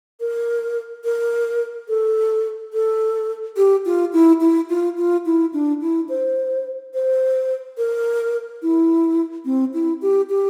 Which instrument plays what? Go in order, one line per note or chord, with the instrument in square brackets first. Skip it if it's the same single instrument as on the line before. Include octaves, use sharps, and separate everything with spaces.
[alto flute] A#4
A#4
A4
A4
G4
F4
E4
E4
F4
F4
E4
D4
E4
C5
C5
A#4
E4
C4
E4
G4
G4